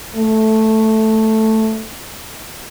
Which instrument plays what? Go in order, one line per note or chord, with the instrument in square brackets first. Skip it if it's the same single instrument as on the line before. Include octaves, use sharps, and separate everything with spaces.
[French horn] A3